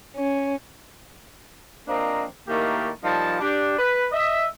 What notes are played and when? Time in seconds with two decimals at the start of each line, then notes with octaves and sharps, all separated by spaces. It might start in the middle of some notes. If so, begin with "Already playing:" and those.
0.15 C#4
1.88 F3 A#3 C4 D4 D#5 A#5
2.48 A2 D#3 A3 A#3 D#4 G4
3.04 A#2 F3 G3 D#4 A5
3.40 D4 G4
3.78 B4
4.12 D#5 E5